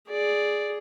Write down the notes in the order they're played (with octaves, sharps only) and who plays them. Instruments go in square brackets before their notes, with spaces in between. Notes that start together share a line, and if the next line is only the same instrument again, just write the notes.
[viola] G#4 [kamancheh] D5